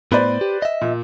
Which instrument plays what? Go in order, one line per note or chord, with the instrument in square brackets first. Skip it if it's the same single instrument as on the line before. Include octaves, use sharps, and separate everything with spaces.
[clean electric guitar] A2 B3 [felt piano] B4 C5 D5
[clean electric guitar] G4
D#5 E5
[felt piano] A#2